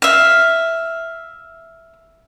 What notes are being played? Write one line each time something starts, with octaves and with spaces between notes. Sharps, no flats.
E5 F5